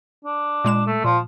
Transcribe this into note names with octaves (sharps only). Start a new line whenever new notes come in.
D4
A#2 G#3 E7
A3
A#2 F3